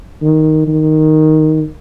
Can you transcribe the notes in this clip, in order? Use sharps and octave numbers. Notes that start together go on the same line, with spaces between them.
D#3
D#3